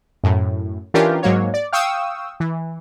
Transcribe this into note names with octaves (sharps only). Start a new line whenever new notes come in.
F#2 A2
E3 C#4 D4 F4 G4 A#4
G#2 F#3 A#3 C#5
D5
F5 G5 C#6 D#6 E6
E3